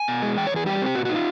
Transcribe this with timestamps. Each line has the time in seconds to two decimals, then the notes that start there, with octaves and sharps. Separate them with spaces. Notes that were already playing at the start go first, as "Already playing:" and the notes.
Already playing: G#5
0.08 B2
0.22 G#3
0.37 E2 G5
0.47 C#5
0.51 E2
0.56 G#4
0.66 G3 G4
0.81 C4 G4
0.95 A#2 F#4
1.05 F#4
1.09 D#4
1.15 F4